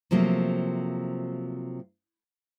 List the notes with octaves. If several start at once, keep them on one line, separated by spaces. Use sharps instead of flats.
C3 F3 F#3 A3 A#3